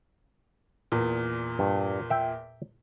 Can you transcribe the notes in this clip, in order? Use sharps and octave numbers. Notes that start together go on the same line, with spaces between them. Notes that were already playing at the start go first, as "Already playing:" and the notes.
E2 A#2
G2
E5 G5